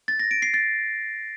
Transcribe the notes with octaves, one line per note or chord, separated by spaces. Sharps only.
A6
A#6
D7
C7
A6